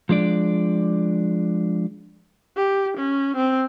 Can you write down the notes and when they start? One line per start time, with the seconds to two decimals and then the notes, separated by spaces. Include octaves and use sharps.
0.09 F3 G#3 D4 D5
2.57 G4
2.97 C#4
3.37 C4